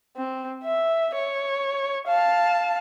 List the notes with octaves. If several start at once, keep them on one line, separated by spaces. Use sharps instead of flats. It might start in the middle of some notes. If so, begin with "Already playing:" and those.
C4
E5
C#5
F5 A5